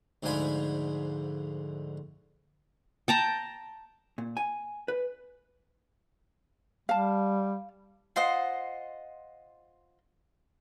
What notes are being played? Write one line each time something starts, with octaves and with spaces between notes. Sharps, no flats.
D2 G#2 D3 F3 G#5 B5
G5 A5 A#5
A#2
G#5
B4
G3 F5 A5
F4 C5 D#5 F#5